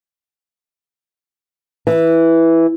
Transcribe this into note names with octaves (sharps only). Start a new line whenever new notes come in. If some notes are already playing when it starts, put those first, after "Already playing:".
E3